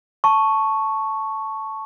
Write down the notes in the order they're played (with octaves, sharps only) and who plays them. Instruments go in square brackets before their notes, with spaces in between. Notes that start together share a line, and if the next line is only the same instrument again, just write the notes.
[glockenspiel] A5 C#6